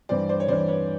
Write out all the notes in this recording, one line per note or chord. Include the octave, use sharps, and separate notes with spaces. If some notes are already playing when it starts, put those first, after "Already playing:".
G2 E3 C5 D5
C5 D5
C#5
G2 E3 C5 D5
B4 C#5